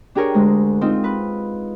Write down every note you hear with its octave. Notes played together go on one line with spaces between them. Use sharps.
D4 G4 G#4 A#4 C#5
D2 G#3
C4 D#4 F4
B4